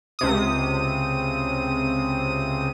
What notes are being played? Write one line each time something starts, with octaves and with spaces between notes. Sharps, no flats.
C#2 C3 D#6